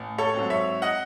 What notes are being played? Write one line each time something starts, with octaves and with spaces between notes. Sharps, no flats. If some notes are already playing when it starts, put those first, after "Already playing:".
Already playing: A1
A4 C#5
G#2 F#3 C4
C#5 E5
D#5 F#5